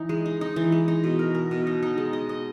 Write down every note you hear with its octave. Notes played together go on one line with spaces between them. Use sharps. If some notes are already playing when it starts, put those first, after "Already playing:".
Already playing: E3 D#4
G#3
D#4
D#4
E3
G#3
D#4
B2
A#4
A#4
B2
D#4
D#4
G#3
D#5
D#5